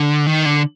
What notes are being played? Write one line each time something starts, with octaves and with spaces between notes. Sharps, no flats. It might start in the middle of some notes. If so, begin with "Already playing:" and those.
Already playing: D3
D#3
D3